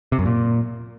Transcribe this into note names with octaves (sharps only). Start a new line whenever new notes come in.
C3
F#2
A#2